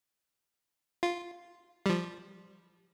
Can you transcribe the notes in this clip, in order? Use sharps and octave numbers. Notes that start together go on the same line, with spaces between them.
F4
F3 G3